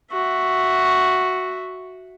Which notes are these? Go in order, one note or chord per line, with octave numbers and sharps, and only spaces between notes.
F#4 E5